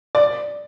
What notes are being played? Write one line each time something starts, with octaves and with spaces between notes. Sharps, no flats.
D5